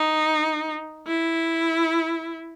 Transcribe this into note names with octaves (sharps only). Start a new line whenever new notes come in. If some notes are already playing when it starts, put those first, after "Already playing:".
Already playing: D#4
E4